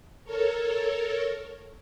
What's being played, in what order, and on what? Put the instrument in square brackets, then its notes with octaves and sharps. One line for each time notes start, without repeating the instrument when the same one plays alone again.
[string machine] A4 A#4 C#5